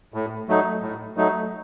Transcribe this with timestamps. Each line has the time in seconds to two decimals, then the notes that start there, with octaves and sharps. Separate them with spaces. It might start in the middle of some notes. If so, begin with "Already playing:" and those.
0.14 A2
0.49 F#3 A3 D#4
0.82 A2
1.17 F#3 A3 D#4